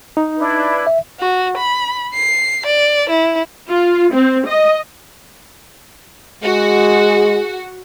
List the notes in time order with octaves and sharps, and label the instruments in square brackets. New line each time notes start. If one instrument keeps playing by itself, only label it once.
[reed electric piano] D#4
[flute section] D4 E4 B4
[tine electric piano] E5
[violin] F#4
B5
C7
D5
E4
[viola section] F4
C4
D#5
[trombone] G#3 [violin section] F#4 [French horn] G#4